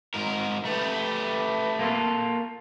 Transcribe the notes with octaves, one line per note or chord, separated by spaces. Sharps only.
G#2 A#4
A3 G4 B4
A#3 F4 A4